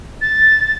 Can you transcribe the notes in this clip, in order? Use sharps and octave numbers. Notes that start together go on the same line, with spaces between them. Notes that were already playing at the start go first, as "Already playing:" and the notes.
A6